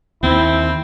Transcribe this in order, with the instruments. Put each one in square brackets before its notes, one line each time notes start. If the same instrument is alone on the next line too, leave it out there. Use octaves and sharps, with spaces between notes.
[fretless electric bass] D#2 [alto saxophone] C4 [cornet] E4